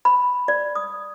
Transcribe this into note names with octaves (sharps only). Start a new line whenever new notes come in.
B5
D5
D#6